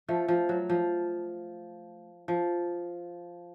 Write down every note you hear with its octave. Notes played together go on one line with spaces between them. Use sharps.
F3 A3
F3
F#3
F3
F3